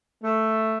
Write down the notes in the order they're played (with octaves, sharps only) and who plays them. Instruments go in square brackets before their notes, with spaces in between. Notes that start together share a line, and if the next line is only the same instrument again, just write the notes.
[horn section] A3